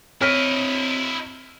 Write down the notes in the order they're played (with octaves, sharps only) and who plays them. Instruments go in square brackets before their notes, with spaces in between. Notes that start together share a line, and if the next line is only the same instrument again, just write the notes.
[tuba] C4 [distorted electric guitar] E4 D#5 [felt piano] C#5 F6 B6